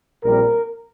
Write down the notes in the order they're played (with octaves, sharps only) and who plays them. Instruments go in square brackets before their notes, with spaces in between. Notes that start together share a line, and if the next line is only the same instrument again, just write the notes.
[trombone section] A#1 A#2 G3 C4 A#4